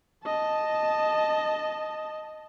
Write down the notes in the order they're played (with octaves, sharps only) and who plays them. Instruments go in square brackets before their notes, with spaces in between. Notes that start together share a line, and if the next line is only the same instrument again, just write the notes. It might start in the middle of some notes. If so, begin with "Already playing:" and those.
[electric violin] D#5 A5